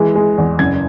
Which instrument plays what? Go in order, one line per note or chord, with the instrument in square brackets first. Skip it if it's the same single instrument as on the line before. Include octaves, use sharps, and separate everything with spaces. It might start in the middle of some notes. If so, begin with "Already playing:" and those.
Already playing: [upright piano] E3 G#3
G#3
E2
F#1 G#6